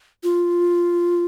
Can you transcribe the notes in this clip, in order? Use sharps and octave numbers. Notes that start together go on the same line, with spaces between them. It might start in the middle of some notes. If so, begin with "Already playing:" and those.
F4